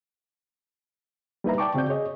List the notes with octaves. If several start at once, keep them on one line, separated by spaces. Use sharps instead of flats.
G3 A#3 D#4 B4 E5 A#5
D5 G5 A5 C#6 D6
C#3 C4 F#4 D5 G6
G#4 C#5 D#5